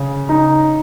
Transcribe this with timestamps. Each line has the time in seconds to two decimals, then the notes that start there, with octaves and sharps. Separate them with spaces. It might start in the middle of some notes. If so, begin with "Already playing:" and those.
Already playing: C#3
0.29 D#4